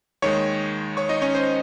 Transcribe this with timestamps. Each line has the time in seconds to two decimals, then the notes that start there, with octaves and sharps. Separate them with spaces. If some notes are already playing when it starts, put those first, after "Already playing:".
0.22 D#2 D#3 G#3 C#5 C#6
0.97 C#5 C#6
1.09 D#4 D#5
1.22 C#4 C#5
1.35 C5